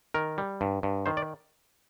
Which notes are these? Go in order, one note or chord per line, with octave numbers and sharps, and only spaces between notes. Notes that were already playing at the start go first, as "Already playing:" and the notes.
D#3 A#4
G3
G2
G2
D#3 C5
D5